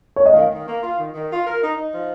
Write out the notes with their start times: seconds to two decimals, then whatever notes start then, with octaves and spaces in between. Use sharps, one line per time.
0.16 C#5
0.26 D#5
0.34 D#3 F5
0.50 D#3
0.66 A#3
0.82 F4
0.97 D#3
1.13 D#3
1.30 F4
1.45 A#4
1.61 D#4
1.76 D#4
1.92 F3